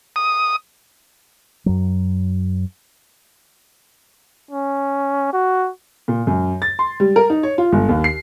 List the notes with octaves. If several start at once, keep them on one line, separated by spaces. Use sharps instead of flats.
D#6
F#2 F#3
C#4
F#4
A#2
F#2
A6
C6
G3
A#4
D#4
C#5
F4
G1
D#2
C7